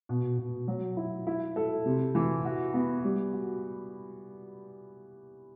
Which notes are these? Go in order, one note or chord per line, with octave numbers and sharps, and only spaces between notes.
B2
B2
F#3
E4
E4
A4
C3
E3
F#4
B3
G3
F#4